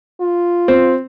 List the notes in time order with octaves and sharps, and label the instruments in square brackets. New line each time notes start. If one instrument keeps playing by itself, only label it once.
[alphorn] F4
[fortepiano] C4